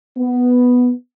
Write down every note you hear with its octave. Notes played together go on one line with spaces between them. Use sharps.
B3